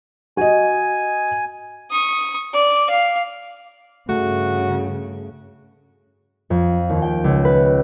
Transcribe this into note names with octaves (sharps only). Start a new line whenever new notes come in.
F#4 D#5 G#5
C#6 D#6
D5
F5
G2 C#3 A3 F#4
F2
D#2
G5
C#2
B4